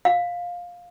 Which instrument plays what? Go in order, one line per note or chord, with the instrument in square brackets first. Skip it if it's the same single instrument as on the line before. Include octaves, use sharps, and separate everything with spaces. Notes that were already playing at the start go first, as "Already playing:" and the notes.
[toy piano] F5